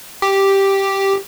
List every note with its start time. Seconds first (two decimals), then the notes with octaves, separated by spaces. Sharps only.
0.22 G4